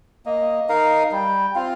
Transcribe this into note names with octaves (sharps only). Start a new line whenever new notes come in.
A#3 D#5
D#4 A#4 F5
G3 G5
C4 F4 F5